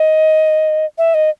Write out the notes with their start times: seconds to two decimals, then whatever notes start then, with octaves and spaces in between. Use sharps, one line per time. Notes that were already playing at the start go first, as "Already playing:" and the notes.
Already playing: D#5
0.98 E5
1.14 D#5